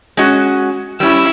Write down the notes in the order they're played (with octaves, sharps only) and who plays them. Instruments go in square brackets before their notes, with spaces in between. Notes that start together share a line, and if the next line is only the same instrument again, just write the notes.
[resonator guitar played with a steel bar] G#3 C#4 F#4
[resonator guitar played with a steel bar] G3 C#4 [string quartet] E4 E6